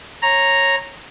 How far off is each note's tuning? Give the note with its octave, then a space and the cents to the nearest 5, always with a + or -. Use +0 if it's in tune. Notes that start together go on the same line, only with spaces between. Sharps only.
C#5 -15 A#5 +0